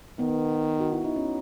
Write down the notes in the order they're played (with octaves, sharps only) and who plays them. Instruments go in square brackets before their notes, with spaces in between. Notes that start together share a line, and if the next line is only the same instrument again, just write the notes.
[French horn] D#3 [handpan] B3
[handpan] F#4
E4
D#4
C#4